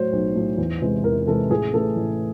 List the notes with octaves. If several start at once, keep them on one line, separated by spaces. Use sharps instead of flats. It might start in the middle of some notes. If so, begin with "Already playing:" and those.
Already playing: A2 F#3 C5 C#5
B1
A2 F#3
E2
C3 E3 G#3
E2 A#4
C3 E3 G#3 A4
A1 G#4
A2 E3 A3 A4
A1